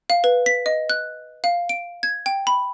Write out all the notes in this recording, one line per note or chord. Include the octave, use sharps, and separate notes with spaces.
F5
B4
B6
D#5
F#6
F5
D7
G#6
G5
B5